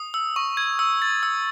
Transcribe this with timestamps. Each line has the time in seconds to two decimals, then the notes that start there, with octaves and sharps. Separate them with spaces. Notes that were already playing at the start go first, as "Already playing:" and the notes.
Already playing: D#6
0.14 E6
0.36 C#6
0.57 G#6
0.79 E6
1.02 A6
1.23 E6